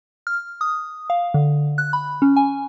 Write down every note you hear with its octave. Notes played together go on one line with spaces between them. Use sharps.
F6
D#6
F5
D3
F#6
B5
C#4
G#5